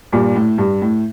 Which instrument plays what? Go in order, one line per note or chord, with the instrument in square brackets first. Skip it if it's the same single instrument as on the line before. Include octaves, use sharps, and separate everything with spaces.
[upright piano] G2 A#2
A2
G2
A2